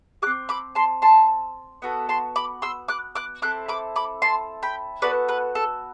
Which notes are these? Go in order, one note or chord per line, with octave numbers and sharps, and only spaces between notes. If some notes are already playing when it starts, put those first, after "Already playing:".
G4 D6 F#6
C4
B5 D6
A5 C6
A5 C6
B3 F#4 A4
A5 C6
B5 D6
C6 E6
D6 F#6
D6 F#6
C4 E4 A4 D6 F#6
B5 D6
B5 D6
A5 C6
G5 B5
B3 F#4 A4 B4 D5
B4
A4